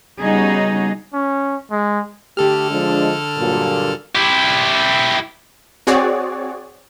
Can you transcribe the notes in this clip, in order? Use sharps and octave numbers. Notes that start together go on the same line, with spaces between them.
C#3 G3 B3 D#4 F#4 G#4
C#4
G#3
D3 A3 G4 A4 F6
F3 G#3 D4
G2 A#2 F#3
E4 G4
C4 F#4 G#4 C#5 D5